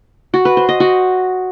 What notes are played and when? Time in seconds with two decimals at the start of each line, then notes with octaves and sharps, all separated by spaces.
0.34 F#4
0.45 B4
0.57 C5
0.69 D#5
0.80 F#4